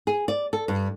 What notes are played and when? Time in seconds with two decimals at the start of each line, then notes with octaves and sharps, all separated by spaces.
0.07 G#4
0.28 D5
0.53 A4
0.68 G2